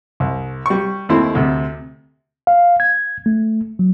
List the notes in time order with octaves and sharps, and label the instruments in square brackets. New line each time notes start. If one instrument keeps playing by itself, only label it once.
[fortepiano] C2
G3 C#6
D#2 A3 C4 E4 C6
D2 C3
[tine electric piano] F5
G#6
A3
F#3